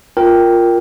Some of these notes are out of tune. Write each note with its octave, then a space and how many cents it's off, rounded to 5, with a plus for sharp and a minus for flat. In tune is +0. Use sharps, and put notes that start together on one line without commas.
F4 +0 A#4 +0 G5 +0